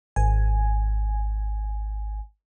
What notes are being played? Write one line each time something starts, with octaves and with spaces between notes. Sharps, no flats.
G#1 G#5